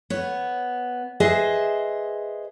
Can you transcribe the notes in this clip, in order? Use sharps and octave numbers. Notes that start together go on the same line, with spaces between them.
B3 C#5
G#4 B4 C5 D#5 E5